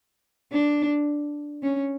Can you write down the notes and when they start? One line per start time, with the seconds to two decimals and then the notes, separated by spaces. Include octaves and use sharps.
0.52 D4
1.63 C#4